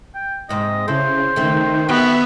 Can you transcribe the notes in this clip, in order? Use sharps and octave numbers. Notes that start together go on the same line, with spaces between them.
G5
D#2 G#2 C3 D#5
C#3 E4 A4 C5
D#3 A3 C4
B3 F#4 G4 E5